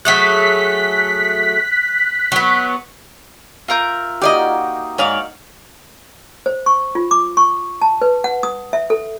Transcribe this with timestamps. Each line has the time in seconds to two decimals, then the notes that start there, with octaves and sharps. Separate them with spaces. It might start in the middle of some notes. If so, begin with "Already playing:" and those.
0.05 F#3 A3 G#4 F#6 B6
2.32 F#3 B3
3.68 F4 A#4 E5 G6
4.21 A#3 D#4 F#4 G4 D5 D#5
4.98 G#2 C#5 D5 F5
6.46 C5
6.66 C#6
6.95 F4
7.11 D6
7.37 C#6
7.82 A5
8.02 B4
8.24 F#5
8.43 D#6
8.73 E5
8.90 A4